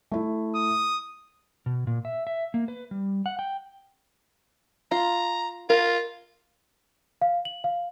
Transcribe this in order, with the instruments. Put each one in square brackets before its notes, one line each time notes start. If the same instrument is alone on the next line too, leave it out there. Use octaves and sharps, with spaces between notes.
[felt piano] A3 E4
[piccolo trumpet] D#6
[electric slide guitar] B2
A#2
E5
E5
A#3
B4
G3
F#5
G5
[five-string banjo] F4 [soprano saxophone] A#5
[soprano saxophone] F4 [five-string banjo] A#4
[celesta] F5
F#7
F5